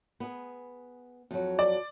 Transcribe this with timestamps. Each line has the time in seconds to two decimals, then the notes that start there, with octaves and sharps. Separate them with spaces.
0.20 B3 G#4
1.31 F2 F#3
1.59 D5